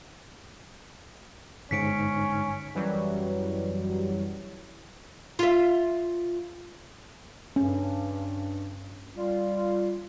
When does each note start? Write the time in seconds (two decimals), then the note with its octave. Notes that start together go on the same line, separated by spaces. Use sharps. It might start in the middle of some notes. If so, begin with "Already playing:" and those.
1.71 G1 G#2 C#4 B6 C#7 D7
2.75 F#2 E3 F#3 G3
5.39 F4 E5
7.56 G2 C#4
9.15 G3 F4